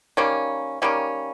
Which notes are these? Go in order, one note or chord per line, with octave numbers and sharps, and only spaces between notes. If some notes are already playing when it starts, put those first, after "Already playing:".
D#3 G3 A#3 C#4
D#3 G3 A#3 C#4